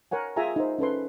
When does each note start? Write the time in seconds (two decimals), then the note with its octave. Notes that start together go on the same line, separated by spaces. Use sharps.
0.11 A#4 C#5 F#5 G#5
0.36 F4 G#4 E5 G5 G#5 A#5
0.56 D#4 A#4 C5
0.79 C#4 A4 B4 C6